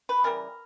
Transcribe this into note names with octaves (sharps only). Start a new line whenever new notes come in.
B4
C#3 E3 G3 A#4